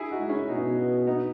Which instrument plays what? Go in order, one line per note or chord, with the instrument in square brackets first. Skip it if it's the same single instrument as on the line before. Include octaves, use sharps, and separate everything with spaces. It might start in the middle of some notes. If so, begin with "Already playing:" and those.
Already playing: [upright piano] E4 G#4
D#4 F#4
[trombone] G#3
[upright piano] C#4 E4
[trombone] B2 [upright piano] B3 D#4
[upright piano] B3 D#4